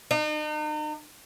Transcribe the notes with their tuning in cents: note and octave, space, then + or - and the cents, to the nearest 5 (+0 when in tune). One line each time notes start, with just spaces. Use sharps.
D#4 -40